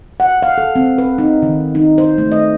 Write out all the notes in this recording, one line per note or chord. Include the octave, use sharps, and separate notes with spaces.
F#5
F5
A4
C4
B4
D#4
D#3
D#4
C5
A3
D#5